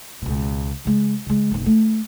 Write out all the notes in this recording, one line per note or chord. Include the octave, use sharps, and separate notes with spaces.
C#2 B2
C#3 G#3
C#3 G#3
F#1 B1
A3